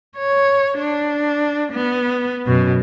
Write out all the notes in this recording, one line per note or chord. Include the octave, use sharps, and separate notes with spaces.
C#5
D4
B3
F#2 B2